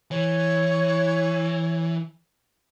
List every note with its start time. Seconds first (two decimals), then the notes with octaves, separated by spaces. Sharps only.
0.11 E3 C#5